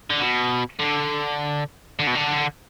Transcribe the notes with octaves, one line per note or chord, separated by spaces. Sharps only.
D3
B2
D3
D3
B2
D3